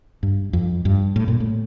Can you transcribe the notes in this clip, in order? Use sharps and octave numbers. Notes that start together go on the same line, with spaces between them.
G2
F2
G2
A2
A#2
A2